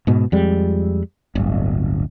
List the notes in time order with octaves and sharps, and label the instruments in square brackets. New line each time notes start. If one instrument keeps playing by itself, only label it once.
[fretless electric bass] G#2 B2
F2 G3 G#3
D1 G1